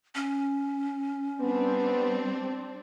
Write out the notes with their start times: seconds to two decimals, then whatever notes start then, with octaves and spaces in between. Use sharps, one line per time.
0.15 C#4
1.41 G3 B3 C4 D4